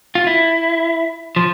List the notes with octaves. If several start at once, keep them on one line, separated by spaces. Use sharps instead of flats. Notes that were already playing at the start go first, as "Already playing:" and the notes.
F4
E4
F3